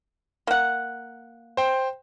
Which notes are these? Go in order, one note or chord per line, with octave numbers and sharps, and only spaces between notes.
A#3 F#5
C5 G5